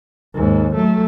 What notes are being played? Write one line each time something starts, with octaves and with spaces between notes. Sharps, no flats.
D#2 G#2
F#3 A3